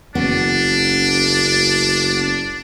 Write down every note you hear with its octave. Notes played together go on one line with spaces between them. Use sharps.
F#1 B3 C#4 D4